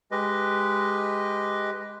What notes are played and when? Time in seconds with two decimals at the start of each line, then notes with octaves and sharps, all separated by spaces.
0.11 G#3 G4 B4 D#5